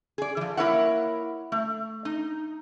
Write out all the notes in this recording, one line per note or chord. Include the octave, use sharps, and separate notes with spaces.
G#4 D5
E3 F3
A#3 E4 A#4 C#5 E5 F#5
A3
D#4